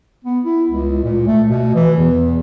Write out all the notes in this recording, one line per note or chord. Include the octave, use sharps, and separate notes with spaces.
B3
E4
C#2
A#2
A3
B2
E3
E2